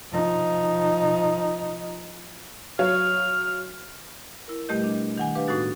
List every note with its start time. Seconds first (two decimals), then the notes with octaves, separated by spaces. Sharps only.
0.12 F3 D#4
2.79 F#3 C#5 F5 F6
4.48 E4 A#4
4.69 B2 G3 A3 G4 D#5 G6
4.83 D4 D#5
5.17 D#3 F#5 G#5
5.35 D4 G4 B4 F5
5.48 A2 G#3 B3 D#4 F#4 A6